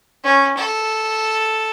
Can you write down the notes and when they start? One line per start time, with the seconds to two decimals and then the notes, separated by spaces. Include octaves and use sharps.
0.24 C#4
0.57 A4